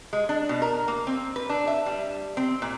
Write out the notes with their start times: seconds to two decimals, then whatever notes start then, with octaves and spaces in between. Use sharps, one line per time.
0.13 G#3
0.29 D4
0.49 B2
0.62 A#4
0.88 A#3
1.07 C4
1.36 B4
1.49 D4
1.68 E5
1.86 G3
2.37 C4
2.62 A#2